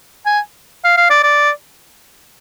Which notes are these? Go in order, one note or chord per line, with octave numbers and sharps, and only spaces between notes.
G#5
F5
F5
D5
D5